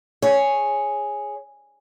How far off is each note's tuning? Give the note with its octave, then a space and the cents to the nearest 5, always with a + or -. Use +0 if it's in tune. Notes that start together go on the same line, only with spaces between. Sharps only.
G#4 +0 C#5 +0